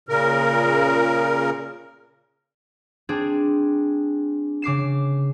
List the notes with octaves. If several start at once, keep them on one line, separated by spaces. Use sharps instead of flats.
A#2 C#3 A#4
C4 D4 G#4
C#3 D6 C7 E7